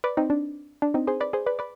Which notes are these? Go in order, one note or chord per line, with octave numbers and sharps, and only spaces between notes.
B4 D5
C4 D#4
D4
D4
C4 D#4
G#4 C5
B4 D5
G#4 C5
B4 D5
B4 D5